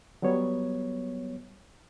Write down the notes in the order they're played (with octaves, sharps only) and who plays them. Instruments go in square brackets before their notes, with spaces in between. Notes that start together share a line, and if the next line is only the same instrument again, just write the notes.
[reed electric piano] F#3 G3 B3 C#5